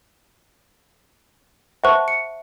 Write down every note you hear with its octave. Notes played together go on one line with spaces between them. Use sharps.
C5 E5 F#5 A5 C#6
C#7